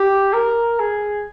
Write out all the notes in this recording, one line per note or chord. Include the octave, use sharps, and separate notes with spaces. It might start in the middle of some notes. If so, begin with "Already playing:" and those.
Already playing: G4
A#4
G#4